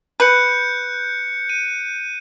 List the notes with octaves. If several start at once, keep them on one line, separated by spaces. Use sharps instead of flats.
B4 F#6 G6 C#7
D#7